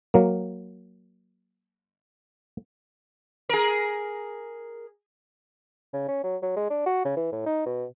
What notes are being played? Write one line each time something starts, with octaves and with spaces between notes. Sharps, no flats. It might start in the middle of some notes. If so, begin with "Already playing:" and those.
F#3 A#3
G#4 A#4
C#3
C#4
F#3
F#3
G#3
D4
F#4
C#3
E3
A2
D#4
B2